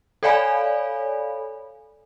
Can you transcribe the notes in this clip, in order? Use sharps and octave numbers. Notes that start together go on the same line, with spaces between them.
A4 C#5 D5 F5 G#5 B5